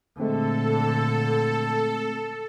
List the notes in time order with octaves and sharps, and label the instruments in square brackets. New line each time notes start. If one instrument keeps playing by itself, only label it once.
[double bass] A#2 D3 [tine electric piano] G#3 A3 C4 [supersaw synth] A4